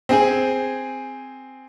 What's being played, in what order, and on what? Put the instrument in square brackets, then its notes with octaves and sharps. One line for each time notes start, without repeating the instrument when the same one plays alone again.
[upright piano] C4 G#4 G#5